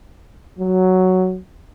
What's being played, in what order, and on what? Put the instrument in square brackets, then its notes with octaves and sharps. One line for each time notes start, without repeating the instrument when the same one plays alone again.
[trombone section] F#3